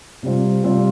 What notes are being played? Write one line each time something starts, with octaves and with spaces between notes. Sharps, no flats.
C3 G3 C4 F4
C3 G3 C4 F4